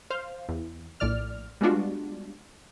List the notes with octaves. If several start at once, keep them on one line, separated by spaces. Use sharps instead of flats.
C5 F5
E2
A#1 A2 D5 F6
G3 G#3 B3 D4 F4 F#4